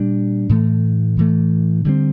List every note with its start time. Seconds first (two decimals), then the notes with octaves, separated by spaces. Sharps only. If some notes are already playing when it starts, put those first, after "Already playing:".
Already playing: A#2 G3 D4
0.49 A2 E3 A3
1.17 A2 E3 A3
1.85 D3 G3 C4